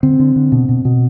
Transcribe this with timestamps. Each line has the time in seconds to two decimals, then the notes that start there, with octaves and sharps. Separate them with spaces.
0.03 D3 C4
0.19 D3
0.36 D3
0.52 B2
0.69 B2
0.85 B2